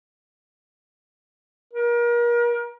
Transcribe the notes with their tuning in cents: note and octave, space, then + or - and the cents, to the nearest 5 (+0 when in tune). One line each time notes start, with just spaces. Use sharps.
A#4 +35